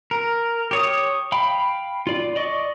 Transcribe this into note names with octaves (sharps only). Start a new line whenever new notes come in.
A#4
G4 C#5 D#6
F5 G5 B5
F4 D5
D5 D#5 C#6